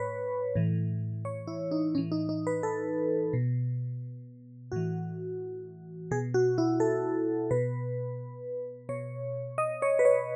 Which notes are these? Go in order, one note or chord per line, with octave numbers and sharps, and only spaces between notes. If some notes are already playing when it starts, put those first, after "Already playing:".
Already playing: A2 B4 C#5
A2 E3
C#5
E4
D#4
A2 E3 C#4
D#4
D#4
B4
A4
B2
A2 E3 F#4
B2 G#4
F#4
E4
A4
B2 B4
B2 C#5
D#5
C#5
B4
C#5